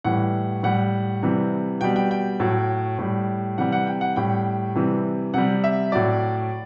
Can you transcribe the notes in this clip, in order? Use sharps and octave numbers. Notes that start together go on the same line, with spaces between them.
A2 E3 G3 F#5
A2 G3 F#5
C3 E3 G3
B2 G3 G5
G5
G5
A2 F#3
A2 G3
C3 E3 G3 F#5
F#5
G5
F#5
A2 G3 G5
C3 E3 G3
C3 G3 F#5
E5
A2 F#3 D5